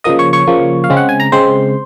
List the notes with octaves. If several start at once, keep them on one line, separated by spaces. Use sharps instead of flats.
C#3 F3 A#3 D#5 D#6
C#5 C#6
C#5 C#6
C#3 F3 A#3
F5
C#3 G#3 C4
F#5
G#5
A#5
C#3 G#3 C4 C5 C6